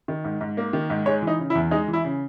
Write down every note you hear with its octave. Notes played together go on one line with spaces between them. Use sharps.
D#3
G#2
G#2
A#3
D#3
G#2
G#3 C#5
E3
D#4
C#3
E4
E2
G#3 D#4
E3
E4
C#3